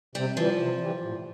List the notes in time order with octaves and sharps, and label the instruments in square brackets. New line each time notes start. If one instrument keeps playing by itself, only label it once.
[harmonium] C3 [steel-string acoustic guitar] G3
[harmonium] E3 G3 [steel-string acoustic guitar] F3
[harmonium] C3
E3 G3
A2